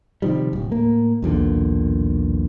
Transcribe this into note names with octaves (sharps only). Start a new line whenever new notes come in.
C3 D#3 F3 G3
D1
A2 A#3
B1 E2 A#2 D3